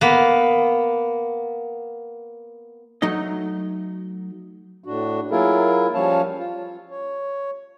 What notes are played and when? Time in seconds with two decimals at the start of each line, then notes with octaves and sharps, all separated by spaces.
0.01 A#3 B3
3.02 F#3 A3 D#4 D#5
4.84 A2 D4 F#4
5.31 F#3 A#3 E4 F4 G#4 A#4
5.94 F3 G3 C#4 C#5 F5 A5
6.39 F4
6.90 C#5